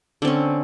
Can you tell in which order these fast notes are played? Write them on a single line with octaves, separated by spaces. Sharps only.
D3 C4 C#4